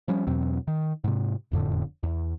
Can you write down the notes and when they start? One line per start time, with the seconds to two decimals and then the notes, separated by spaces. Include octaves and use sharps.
0.08 F3 G3 C#4
0.27 E2 B2 F#3 C4
0.68 D#3
1.04 G#2 C3
1.52 E1 F2 A2 D3
2.03 E2